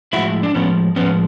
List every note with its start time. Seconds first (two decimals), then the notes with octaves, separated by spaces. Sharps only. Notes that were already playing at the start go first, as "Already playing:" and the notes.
0.13 A2 F3 G#3 E4 F#4
0.43 D4
0.55 A2 F3 G#3 B3 C#4
0.96 A2 F3 G#3 B3 C#4